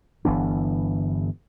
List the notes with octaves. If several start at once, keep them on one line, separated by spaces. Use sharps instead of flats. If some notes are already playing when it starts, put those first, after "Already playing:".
G1 E3 B3 D4